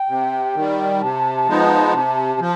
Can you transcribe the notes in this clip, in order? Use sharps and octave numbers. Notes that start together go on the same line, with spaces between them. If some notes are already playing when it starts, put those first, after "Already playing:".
Already playing: G5
C3
D#3 G3
C3 A5
F3 G#3 B3 D#4
C3
F3